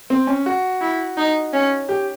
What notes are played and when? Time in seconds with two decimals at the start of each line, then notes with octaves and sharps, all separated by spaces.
0.10 C4
0.27 C#4
0.46 F#4
0.81 E4
1.17 D#4
1.53 C#4
1.89 G4